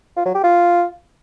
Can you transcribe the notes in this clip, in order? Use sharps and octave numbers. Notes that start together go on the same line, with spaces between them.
F4
F#3
G4
F4